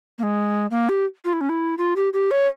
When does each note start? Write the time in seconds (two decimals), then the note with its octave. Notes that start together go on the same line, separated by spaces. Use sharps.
0.18 A#3
0.23 G#3
0.71 A#3
0.89 G4
1.25 F4
1.33 E4
1.41 C#4
1.49 E4
1.78 F4
1.96 G4
2.13 G4
2.31 C#5